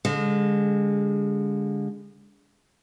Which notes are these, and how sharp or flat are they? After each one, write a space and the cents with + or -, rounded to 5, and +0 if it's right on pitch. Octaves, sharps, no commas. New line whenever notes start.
D3 -35 G#3 -30